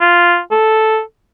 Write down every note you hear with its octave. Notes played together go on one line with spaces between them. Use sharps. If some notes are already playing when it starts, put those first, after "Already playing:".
F4
A4